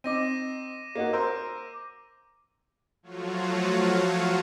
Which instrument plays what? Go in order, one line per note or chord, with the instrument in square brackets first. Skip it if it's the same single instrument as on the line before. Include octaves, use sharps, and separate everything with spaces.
[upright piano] C4 D#4 [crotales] D6 A#6 D#7
[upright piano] A#3 D#4 F#4
A#4 C5 E6
[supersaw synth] F3 F#3 A3 F4 F#4 C#5